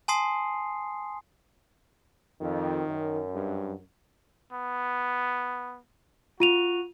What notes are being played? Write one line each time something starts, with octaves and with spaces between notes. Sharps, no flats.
G#5 A5 C6 D#6 C7
F2 D#3
F#2
G2
B3
F4 F#4 D#7 F7